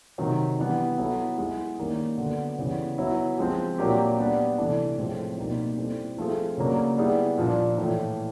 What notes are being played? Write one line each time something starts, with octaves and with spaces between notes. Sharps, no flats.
C3 D#3 F#3
E3 G3 B3 D4
F#3 B3 E4 A4
G#3 B3 E4 G#4
D#3 G3 A#3 C#4
D3 F#3 B3
C#3 E3 G3 B3
F#3 B3 E4
F3 G#3 C4
A#2 F#3 A#3 D4 G4
G3 B3 D4
C3 E3 A3 D4
A2 F3 G#3 C4
B2 G3 A#3 D#4
G3 C4 E4 A4
F3 A3 C4 F4 G#4
C#3 F#3 A#3 D4
G3 B3 E4 G#4
A#2 F3 A#3 D4
A2 E3 A3